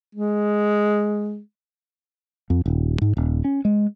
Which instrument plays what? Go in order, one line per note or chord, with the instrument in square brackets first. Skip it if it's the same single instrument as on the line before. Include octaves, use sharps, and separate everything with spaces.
[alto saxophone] G#3
[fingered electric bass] F2
D#1
G#2
D#1
C#4
G#3